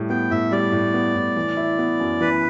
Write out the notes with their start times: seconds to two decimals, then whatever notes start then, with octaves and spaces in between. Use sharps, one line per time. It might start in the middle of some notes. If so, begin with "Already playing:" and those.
Already playing: A2 G3
0.10 B3 G5
0.31 A2 E5
0.51 G3 D5
0.72 A2
0.94 B3
1.15 A2
1.36 E3
1.57 E4
1.78 B3
2.00 F#2
2.21 E3 B4